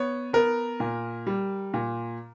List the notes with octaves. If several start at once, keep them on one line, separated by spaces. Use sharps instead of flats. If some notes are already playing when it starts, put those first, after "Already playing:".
Already playing: B3 C#5
B3 A#4
A#2
G3
A#2